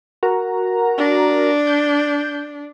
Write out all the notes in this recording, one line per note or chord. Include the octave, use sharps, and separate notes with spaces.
F#4 A#4 A#5
D4
G6